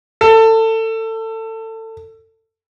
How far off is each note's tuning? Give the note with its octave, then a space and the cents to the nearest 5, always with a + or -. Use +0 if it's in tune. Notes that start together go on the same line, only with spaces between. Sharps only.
A4 +25